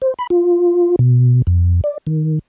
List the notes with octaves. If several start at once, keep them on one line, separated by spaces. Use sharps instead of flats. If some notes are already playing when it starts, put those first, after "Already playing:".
C5
B5
F4
B2
F2
D5
D#3